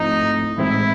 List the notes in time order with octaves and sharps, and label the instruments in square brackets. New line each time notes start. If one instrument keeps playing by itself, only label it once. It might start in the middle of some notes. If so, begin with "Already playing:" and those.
Already playing: [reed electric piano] G#2 F3 A3 C4 E4 [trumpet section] D#4
[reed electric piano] A2 E3 G#3 C4 D#4 [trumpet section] E4